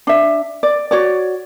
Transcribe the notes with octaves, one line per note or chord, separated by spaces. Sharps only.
D4 E5
D5
F#4 C#5 D5